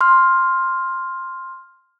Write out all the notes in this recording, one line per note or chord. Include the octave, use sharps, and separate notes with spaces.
C6 F6